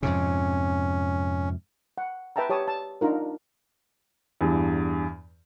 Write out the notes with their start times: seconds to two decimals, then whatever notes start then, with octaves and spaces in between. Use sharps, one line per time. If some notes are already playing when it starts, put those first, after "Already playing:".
0.03 F2 G#2 C3 C#4
1.98 F#5
2.36 B4 E5 G5 A5 A#5
2.50 G4 C#5 A5 D#6
2.68 A5
3.01 D4 D#4 F4 A#4
4.41 E2 G2